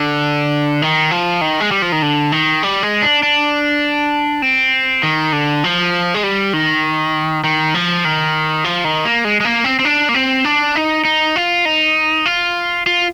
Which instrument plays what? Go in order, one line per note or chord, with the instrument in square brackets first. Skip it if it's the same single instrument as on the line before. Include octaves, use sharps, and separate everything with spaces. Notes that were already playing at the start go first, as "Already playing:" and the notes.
Already playing: [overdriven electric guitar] D3
D#3
F3
D#3
G#3
G3
F3
D#3
D3
D#3
G3
G#3
D4
D4
C4
D#3
D3
F3
G#3
G3
D#3
D#3
F3
D#3
F3
D#3
A#3
G#3
G#3
A#3
C4
C4
D4
A#3
C4
D4
D#4
D#4
F4
D#4
F4
F4